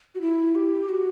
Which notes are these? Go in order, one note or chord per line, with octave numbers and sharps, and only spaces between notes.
F#4
E4
G4
F#4